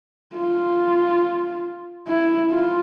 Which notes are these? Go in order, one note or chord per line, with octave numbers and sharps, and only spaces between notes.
F4
E4
F4